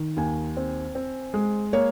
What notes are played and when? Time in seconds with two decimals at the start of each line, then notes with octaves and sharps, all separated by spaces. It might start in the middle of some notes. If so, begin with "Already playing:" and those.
Already playing: D#3
0.17 D#2 G#5
0.57 C4
0.95 C4
1.34 G#3
1.73 A#3 C#5